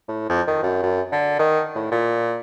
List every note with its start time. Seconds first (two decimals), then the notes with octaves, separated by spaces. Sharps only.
0.08 A2
0.29 F2
0.47 D#3
0.63 F#2
0.83 F#2
1.12 D3
1.40 D#3
1.76 A2
1.92 A#2